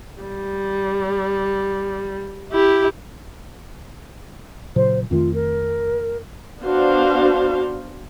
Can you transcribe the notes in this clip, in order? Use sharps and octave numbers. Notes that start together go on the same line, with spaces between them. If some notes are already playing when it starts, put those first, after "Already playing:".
G3
E4 G4
A#2 C#3 F#3 C5
F2 D#3 A3 F4
A#4
B3 D4 F#4 C5 F5